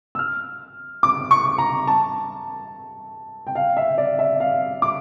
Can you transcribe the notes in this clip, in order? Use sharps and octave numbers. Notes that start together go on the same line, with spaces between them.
E6
F6
D6
C#6
A#5
A5
G5
F5
E5
D5
E5
F5
D6